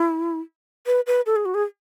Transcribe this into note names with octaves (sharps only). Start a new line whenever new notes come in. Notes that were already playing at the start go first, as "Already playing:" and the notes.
Already playing: E4
B4
B4
A4
G#4
F#4
G#4